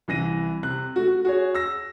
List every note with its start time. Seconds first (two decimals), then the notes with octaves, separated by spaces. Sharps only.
0.08 C2 E3 A#6 D#7
0.63 C3 F#6
0.96 A3 F#4
1.07 F#4
1.25 F#4 G#4 C#5
1.55 E6 A#6